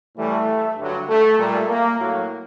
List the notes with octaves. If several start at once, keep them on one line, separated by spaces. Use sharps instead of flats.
A2 E3 G3 A3
G2 D3 F#3
A3
A#2 G3 A3
A#3
A2 F#3 A#3